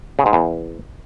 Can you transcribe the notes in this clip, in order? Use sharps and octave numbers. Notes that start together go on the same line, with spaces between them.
C#3
G#2
E2